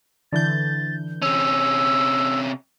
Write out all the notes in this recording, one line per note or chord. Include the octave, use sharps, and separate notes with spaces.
D3 E3 G6 A6
C3 C#4 E6